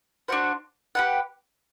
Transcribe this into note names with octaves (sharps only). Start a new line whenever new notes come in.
D4 F#4 C5 F#5
G4 B4 F#5